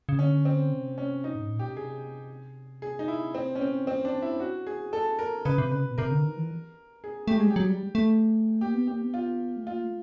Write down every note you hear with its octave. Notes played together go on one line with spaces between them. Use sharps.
C#3
D3 C#4
C4
C3
C#4
D#4
G#2
A2
A#2 G4
B2
C3 G#4
G#4
D#4
E4
C4
C#4
C4
E3 C4
D4
E4
F#4
G#4
A4
A#4
C#3 B4
C3
C#3 B4
C3
B2
C3 A#4
D3
D#3
E3
G#4
A3 G4
G#3 G#4
G3 G4
F#3
G3
A3
A#3 G4
B3
A#3 G4
B3
F4
A3
A#3 F4
A3